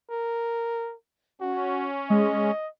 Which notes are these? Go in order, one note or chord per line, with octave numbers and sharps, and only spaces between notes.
A#4
C#4 F#4
G#3 D#5